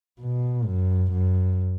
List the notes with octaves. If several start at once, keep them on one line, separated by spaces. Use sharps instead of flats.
B2
F#2
F#2